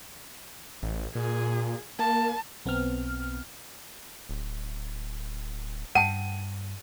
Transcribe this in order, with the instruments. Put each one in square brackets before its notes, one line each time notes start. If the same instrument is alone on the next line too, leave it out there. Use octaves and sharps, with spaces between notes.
[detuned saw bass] A1
[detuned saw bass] A#2 [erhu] G#4
[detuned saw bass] A#3 [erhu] A5
[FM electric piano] B1 B3 C4 F6
[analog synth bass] D1
[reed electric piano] G2 [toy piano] F#5 G5 A5 [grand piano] D#7